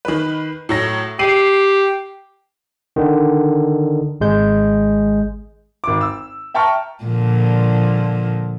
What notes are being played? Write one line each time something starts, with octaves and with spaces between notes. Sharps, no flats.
D#3 B4
A2 F#3 A#6
G4 C7 D#7 F#7
D3 D#3
G#1 G#3 G6
G#1 D6
E6
E5 G5 A5 A#5 C#6 F6
A#2 D3 F3